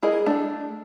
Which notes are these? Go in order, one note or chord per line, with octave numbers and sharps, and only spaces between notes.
E4 G#4 A#4 D#5
A3 D4